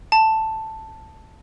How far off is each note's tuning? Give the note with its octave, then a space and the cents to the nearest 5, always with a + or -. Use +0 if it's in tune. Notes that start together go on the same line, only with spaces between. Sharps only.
A5 +5